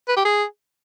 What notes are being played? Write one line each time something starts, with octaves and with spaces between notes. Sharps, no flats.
B4
G4
G#4